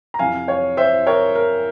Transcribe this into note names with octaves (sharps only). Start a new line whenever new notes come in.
A#5
F2 C3 E3 F5 G#5
C#5 F5
C5 E5
A#4 C#5
A#4